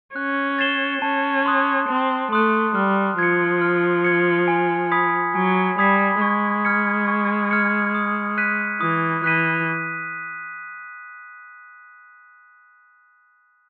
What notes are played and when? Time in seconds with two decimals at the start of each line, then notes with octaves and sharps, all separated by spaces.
0.15 C#4 F#6
0.59 A6 C7 E7 G7
1.02 C#4 A5
1.46 C6 D#6 F#6
1.89 C4 A5
2.32 A3 C6 D#6 F#6
2.75 G3 F6
3.19 F3 G#6 C#7
3.61 F6
4.04 G#6 C#7
4.48 G#5
4.91 B5 D#6 G#6 B6
5.35 F#3 G#5
5.78 G3 B5 D#6 G#6 B6
6.21 G#3 C#6
6.65 F6 G#6 C#7
7.08 C#6
7.51 F6 G#6 C#7
7.95 D#6
8.38 F#6 B6 D#7
8.81 E3 D#6
9.24 E3 F#6 B6 D#7